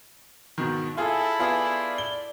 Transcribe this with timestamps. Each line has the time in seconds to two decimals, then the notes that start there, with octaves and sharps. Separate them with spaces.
0.58 G#2 B2 D#3
0.97 E4 F4 G#4 A4
1.39 B3 F4 G#4 D5
1.98 G7